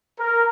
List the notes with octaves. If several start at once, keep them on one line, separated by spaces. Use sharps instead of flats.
A#4